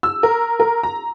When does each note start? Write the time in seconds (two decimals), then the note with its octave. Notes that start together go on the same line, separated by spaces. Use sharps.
0.03 E6
0.23 A#4
0.60 A#4
0.83 A#5